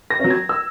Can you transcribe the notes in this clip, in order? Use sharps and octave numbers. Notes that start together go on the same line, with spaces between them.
A#6
F#3 C#4
G#6
E6